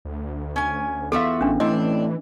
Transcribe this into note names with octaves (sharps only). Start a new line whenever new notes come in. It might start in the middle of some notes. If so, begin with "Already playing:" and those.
D2
C#4 G#5
E2 F4 F#4 A4 E5 F5
A1 C#4 D4
A2 E3 C4 D4 D#5